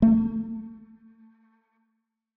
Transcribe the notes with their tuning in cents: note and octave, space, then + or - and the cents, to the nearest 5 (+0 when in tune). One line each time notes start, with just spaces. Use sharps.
A3 +30